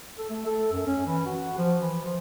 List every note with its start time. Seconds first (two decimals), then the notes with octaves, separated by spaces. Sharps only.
0.18 A4
0.29 A3
0.46 A4
0.72 F#2
0.87 C#4
1.07 E3
1.26 F#4
1.58 F3
1.80 E3
2.05 F3